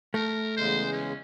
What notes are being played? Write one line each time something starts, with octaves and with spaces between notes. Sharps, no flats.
A3 A#4
E2 C#3 G#3 C5
C#4